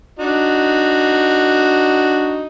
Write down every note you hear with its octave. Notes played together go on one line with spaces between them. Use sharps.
D4 D#4 F#4